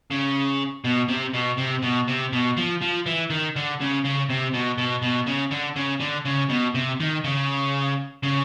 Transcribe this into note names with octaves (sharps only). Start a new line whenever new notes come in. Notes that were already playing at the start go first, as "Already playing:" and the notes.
C#3
B2
C3
B2
C3
B2
C3
B2
F3
F3
E3
D#3
D3
C#3
C#3
C3
B2
B2
B2
C#3
D3
C#3
D3
C#3
B2
C3
D#3
C#3
C#3